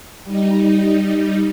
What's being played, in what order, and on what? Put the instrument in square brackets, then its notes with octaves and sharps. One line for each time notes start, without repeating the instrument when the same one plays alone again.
[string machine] G3 D#4